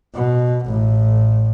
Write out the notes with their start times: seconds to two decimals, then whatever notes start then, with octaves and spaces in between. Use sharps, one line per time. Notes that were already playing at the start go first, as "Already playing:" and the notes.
0.15 B2
0.65 A1 A2